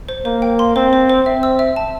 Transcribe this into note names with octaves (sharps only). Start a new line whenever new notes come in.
C5
A#3 C5
G5
C6
C4 C5
C5
C5
C4 E5
E6
E5
A5